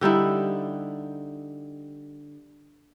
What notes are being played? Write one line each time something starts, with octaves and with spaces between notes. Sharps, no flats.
D3 G3 D#4 E4